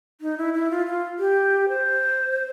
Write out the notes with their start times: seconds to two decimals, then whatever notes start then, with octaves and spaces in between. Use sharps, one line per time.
0.21 D#4
0.38 E4
0.54 E4
0.70 F4
0.86 F4
1.19 G4
1.69 C5